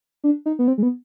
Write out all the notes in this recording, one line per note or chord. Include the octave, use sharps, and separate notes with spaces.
D4
D#4
B3
C4
G#3
B3